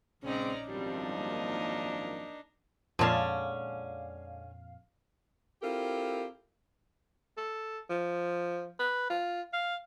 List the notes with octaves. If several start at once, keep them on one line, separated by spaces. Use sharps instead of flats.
A#1 C#3 G#3 C4 C#4 D#4 D5 A#5
G#1 F#2 F3 G3 C4 D4 D#4
A#3
F2 A#2 D3 G#3 C#4 D5 F5 A5
C4 E4 F4 G4 A4 A#4
A4
F3
B4
F4
F5